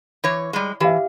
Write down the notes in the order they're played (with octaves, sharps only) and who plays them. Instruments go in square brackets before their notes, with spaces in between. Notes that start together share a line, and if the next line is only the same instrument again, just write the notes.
[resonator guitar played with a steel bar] E3 C#5
G3 G#3
[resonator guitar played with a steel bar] E3 [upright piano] G4 E5 F5